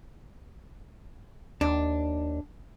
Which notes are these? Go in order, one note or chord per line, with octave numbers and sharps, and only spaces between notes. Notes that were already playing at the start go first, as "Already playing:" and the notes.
D#2 D4